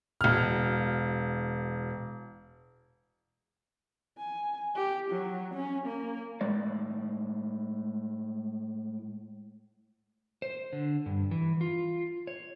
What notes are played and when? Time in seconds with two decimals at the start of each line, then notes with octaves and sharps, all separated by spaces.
0.21 E1 F6
4.18 G#5
4.76 G4
5.11 F#3
5.54 C#4
5.87 A#3
6.41 A2 G#3 D5
10.42 C5
10.73 D3
11.06 G2
11.31 E3
11.61 F4
12.27 C#5